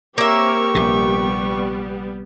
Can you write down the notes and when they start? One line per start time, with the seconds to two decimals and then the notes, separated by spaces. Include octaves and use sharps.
0.18 A#3 C4 G4 A#4 C#5 E5 C#6
0.75 A#1 C3 G3 B3